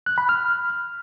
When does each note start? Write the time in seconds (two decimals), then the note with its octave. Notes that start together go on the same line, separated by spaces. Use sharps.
0.06 F#6
0.18 B5
0.29 F6